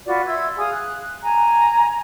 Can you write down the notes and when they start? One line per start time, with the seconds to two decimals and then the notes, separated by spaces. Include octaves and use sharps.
0.05 F4 F#4 B4 D5
0.27 E5 C6 E6 G#6
0.57 G#4 F5 D#6
0.71 F#6
1.22 G#5 A#5